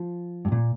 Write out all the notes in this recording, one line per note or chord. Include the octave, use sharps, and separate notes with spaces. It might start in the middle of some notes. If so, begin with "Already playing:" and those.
Already playing: F3
G2
A#2